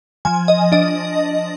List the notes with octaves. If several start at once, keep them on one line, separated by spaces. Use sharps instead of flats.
F3 G#5
D#5
D4 D#5